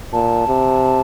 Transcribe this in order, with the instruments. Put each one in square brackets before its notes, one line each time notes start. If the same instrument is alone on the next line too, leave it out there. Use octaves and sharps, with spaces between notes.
[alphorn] A#2 [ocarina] A5
[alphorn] C3